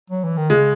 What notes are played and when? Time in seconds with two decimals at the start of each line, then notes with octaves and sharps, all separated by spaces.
0.10 F#3
0.24 E3
0.37 D#3
0.50 C#3 G#3